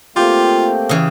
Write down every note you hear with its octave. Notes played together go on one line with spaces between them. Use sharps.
A3 A#3 C4 F4 G4
C#3 E3